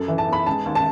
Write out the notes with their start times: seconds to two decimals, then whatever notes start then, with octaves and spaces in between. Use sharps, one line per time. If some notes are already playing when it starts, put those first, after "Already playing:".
Already playing: F#2 A4
0.08 E3
0.18 A5
0.28 B3 B5
0.46 G#3 A5
0.66 D#2
0.75 A5